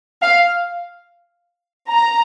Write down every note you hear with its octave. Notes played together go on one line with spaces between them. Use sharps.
F5
A#5